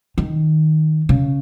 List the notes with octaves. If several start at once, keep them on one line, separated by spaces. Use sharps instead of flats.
D#3
C#3